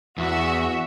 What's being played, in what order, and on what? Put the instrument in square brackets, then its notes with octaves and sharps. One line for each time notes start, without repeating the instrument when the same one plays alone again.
[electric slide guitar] E2 [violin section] F#4 E5